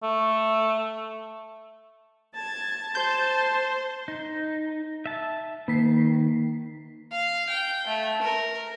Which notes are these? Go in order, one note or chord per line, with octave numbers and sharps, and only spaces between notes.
A3
A5 G#6 A6
C5 A5 G6
D#4
E5 A5
D#3 A#3 B6 C7
F5
G5
A3
A#4